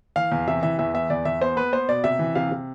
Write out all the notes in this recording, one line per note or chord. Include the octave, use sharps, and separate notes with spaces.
E3 F5
E2
C3 E5
E3 E5
E2 E5
B3 E5
E2 D5
E2 E5
B3 C5
B3 B4
B3 C5
B2 D5
C3 E5
E3
C3 F5
C3